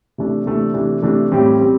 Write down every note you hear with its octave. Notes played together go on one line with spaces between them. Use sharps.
C3 E3 A3 D4
C3 E3 A3 D4
C3 E3 A3 D4
C3 E3 A3 D4
A2 E3 G3 C4 G4
G3 C4 G4